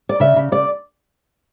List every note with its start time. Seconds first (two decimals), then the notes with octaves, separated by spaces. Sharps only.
0.09 D5
0.20 C#3 E5
0.36 C#3
0.52 C#3 D5